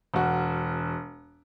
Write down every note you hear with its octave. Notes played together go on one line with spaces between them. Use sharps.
E1 F#4